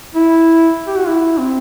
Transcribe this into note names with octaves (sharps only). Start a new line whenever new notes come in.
E4
G4
F#4
E4
C4